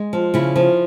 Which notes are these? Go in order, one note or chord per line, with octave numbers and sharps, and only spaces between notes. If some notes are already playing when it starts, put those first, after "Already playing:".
Already playing: G#3
F3
C#3 E4
F3